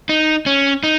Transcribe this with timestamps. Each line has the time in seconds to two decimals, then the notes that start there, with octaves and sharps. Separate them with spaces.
0.09 D#4
0.46 C#4
0.83 D#4